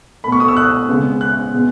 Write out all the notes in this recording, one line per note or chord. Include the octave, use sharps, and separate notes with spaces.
B2 A3 B5
C#6
D#6
E6
F#6
C#3 G#3 B3
F#6
B2 G#3 B3